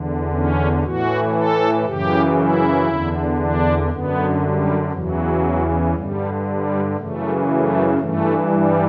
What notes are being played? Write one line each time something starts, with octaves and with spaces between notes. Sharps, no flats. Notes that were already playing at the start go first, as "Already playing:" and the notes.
Already playing: E2 D3
C#4
A2 E3 F#4
A4
F#2 C#3 E3 G4
E4
E2 D3
D4
F#2 D3 B3
G3
E2 C#3 E3 F#3
G2 D3 G3
G3
F#2 C#3 E3 A3
A3
G2 E3 A3
G3